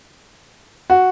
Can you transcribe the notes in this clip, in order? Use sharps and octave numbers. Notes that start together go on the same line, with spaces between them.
F#4